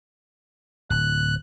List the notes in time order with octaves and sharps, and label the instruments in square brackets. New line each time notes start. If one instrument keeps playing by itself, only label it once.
[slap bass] D1 [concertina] F#6